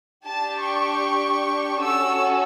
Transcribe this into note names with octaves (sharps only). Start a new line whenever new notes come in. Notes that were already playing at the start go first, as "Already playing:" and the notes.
D4 G4 A5
C#6
C#4 F#4 A4 E6